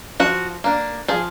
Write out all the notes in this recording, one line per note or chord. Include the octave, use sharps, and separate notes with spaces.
F3 F#4
A#3 D4
F3 G#4